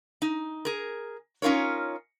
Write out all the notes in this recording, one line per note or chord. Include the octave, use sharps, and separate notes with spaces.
D#4
G#4 A#4
C#4 D#4 F4 A#4 C#5